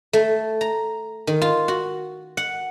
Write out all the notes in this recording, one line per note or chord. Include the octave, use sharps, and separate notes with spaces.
A3
A#5
D#3
F4
F#4
F#5